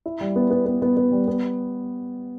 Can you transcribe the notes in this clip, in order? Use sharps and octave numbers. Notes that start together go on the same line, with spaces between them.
E4
G3
B3
B3
B3
B3
B3
G3
B3